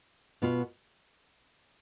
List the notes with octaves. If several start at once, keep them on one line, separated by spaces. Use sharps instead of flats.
B2 B3 F4